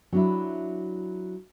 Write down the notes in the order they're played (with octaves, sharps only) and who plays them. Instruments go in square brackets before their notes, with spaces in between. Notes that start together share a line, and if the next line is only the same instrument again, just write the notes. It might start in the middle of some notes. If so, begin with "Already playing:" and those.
[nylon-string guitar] F#3 D4 E4